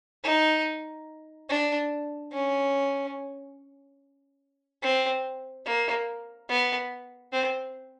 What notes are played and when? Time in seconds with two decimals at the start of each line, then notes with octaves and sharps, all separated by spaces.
0.24 D#4
1.49 D4
2.32 C#4
4.82 C4
5.65 A#3
6.49 B3
7.32 C4